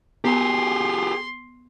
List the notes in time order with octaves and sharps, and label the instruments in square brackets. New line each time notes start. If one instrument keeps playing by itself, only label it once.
[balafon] B3 [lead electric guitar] G4 G#4 [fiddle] C6